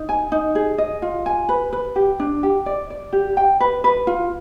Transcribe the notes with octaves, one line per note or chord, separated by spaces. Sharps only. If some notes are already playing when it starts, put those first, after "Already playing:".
Already playing: D#4
G#5
D#4
G#4
D#5
F4
G#5
B4
B4
G4
D4
G4
D5
D5
G4
G5
B4
B4
F4